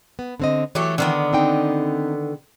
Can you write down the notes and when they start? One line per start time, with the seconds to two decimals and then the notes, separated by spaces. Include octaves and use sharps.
0.19 B3
0.40 D3 C4 D#5
0.75 E3 F#3 A3 G4
0.98 D3 D#3 B3
1.33 C4 D#4 G5